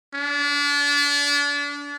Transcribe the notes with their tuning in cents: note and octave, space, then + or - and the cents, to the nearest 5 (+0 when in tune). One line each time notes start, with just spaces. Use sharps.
D4 -35